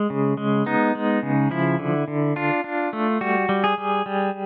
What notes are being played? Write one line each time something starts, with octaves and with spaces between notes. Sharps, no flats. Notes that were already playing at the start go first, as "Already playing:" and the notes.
Already playing: G#3
C#3
G#3
B3 D#4
G#3
C#3
F3 E4
D3
D3
D4 F4
D4
A3
G3 F#4
G3
G#4
G3
G3